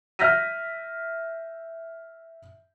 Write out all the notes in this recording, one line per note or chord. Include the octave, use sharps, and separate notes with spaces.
E5 F6 G6 A#6 B6 D#7